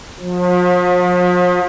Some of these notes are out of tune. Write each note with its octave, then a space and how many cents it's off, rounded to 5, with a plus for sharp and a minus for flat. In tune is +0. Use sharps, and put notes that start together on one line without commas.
F3 +40